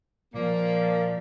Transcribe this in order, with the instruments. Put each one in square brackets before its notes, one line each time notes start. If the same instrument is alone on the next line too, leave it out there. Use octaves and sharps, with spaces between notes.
[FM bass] A#2 [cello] F3 [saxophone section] A#3 [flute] D5